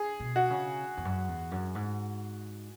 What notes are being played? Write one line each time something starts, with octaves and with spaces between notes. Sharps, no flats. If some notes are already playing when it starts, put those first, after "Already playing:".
Already playing: G#4
B2
F#4
C#3
E2
F#2
E2
F#2
G#2